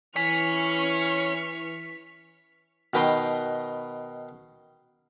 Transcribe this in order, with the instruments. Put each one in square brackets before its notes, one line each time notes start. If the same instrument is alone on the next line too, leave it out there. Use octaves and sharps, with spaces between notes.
[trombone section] E3 [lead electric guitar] C#5 G#5 [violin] C#6 F6 [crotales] B6
[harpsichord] B2 D#3 B4 G5 A#5 C6